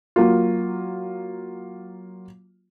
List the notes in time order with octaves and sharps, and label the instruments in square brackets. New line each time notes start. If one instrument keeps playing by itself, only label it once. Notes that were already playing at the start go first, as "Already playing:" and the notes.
[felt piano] F#3 A#3 F4